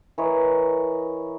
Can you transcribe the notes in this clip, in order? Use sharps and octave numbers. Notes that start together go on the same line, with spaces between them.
E3 A#4 C#5 D#5